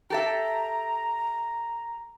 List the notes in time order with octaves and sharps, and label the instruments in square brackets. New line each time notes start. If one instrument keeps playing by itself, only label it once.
[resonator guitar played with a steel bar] G4 A4 E5 [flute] A#5